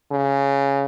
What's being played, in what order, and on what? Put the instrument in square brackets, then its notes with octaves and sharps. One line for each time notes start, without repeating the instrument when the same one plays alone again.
[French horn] C#3